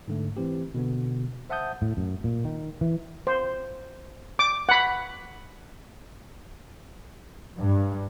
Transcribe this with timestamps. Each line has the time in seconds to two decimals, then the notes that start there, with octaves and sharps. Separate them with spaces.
0.08 G#2 D3 A3
0.37 E3 C4 G4
0.74 B2 D3 B3
1.50 C5 E5 F#5 A5 D#6 G6
1.82 A2
1.97 F#2
2.24 A#2
2.45 D#3
2.81 E3
3.27 C5
4.39 D6
4.69 F#5 B5
7.58 G2